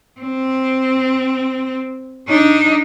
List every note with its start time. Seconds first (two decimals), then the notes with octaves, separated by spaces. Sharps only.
0.21 C4
2.28 D4 D#4